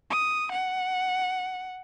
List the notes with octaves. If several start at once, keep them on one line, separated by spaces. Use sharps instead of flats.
D#6
F#5